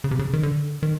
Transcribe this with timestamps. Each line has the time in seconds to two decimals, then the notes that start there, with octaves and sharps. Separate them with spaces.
0.04 C#3
0.11 C3
0.19 C#3
0.33 D#3
0.43 D3
0.83 D#3